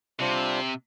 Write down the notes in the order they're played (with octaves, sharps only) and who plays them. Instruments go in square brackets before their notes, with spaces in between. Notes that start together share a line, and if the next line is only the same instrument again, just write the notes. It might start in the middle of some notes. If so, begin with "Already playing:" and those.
[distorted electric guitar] C3 [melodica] G3 D4 F4 C5